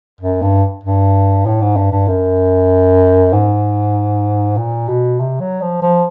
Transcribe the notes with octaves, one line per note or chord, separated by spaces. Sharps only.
F#2
G2
G2
A2
G#2
G2
G2
F#2
G#2
A#2
B2
C3
F#3
F3
F3